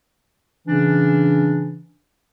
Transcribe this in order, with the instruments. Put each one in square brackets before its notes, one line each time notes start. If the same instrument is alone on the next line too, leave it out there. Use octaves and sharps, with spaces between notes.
[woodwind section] C#3 E3 C#4 D4